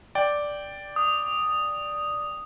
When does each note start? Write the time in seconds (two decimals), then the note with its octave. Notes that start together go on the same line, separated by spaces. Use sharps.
0.15 D5 G5
0.96 D#6